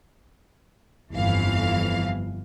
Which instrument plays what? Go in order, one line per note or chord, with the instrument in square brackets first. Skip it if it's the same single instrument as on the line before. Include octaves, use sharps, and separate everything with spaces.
[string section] G1 F2 E3 F5